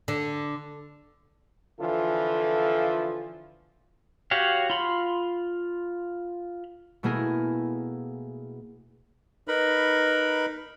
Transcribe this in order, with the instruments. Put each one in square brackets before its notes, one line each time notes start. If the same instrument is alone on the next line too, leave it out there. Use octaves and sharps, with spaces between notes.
[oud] D3
[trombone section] D3 E3 F3 F4 A4
[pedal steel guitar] F#4 G4 C#5 F5
F4 B5 C6
[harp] B2 A3 A#3 E4 G#4 A#4
[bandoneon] D#4 A#4 B4 B5